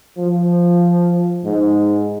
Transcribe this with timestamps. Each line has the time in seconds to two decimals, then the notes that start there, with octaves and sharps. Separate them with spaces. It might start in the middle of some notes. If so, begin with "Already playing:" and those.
0.18 F3
1.45 G#2